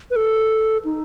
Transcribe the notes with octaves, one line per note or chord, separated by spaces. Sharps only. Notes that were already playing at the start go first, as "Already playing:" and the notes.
B4
A4
D#4